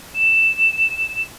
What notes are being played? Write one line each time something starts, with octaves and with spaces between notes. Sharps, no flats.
E7